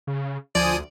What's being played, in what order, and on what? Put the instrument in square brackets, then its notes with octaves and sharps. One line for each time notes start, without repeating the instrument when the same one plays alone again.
[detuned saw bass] C#3
[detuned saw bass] D2 [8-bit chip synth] F3 G#5 D#6 [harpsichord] D5